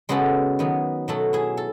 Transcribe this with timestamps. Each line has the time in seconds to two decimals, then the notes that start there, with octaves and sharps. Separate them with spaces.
0.09 C#3 G#3 B3 F#4 A4
0.59 D#3 F#3 B3
1.08 B2 F#3 A3 F#4 A4
1.33 E4 G#4
1.57 A4